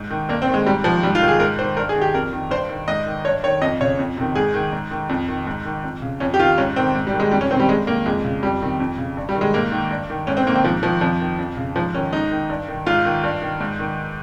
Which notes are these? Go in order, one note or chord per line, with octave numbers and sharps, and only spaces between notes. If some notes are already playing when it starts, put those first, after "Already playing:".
Already playing: G#2
D#3
G2 A#3
C4
D#3
G#3
G#2 G3
D#3 F3
G#2 G3
F4
D#3
G#4
G#2 A#4
D#3 C5
G2 A#4
G#4
D#3
G4
F2 A#4
D#3
G2 C5
D#3
G#2 D#5
D#3
G2 C#5
D#3 C#5
F2 D#5
C#3 C#5
F2
C3 D#3
G#2 G#4
D#3
G#2
D#3
F2
D#3
G#2
D#3
F2
C#3
F2 C#4
G4
D#3 F4
G#2 C#4
D#3 C4
G#2
G3
D#3
G#3
F2 G3
C#4
C3 D#3 C4
G3
G2 G#3
D#3 A#3
F2 G#3
C#3
F2 G3
C3 D#3
F2
C#3
G2
G3
D#3
G#3
G#2 A#3
D#3
G2
D#3
G#2 C#4
C4
D#3 A#3
C4
G#2 F3
D#3 F3
F2 F3
D#3
F2
C#3
G#2 F3
D#3 C#4
G#2 D#4
D#3
G2
D#3
G#2 F4
D#3
G2
D#3
G#2
D#3